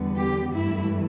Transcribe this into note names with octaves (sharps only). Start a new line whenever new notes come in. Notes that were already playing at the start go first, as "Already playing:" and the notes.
Already playing: E2 D3 G3 B3
G4
G2 E3 A3 E4